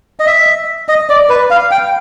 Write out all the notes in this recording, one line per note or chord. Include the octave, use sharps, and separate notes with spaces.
D#5
E5
D#5
D5
B4
F5
G5